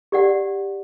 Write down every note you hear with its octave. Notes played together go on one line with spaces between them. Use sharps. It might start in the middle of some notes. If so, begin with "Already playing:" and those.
G4 D5 F#5